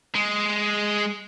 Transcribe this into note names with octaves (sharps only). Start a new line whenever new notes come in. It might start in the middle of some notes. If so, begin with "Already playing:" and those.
G#3